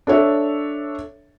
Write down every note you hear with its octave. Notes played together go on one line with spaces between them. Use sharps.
D4 A4 C#5 E5